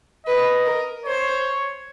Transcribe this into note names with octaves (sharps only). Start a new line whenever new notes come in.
B4 D#5
A#4
C5 C#5